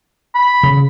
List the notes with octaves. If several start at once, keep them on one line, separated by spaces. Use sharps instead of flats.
B5
C#3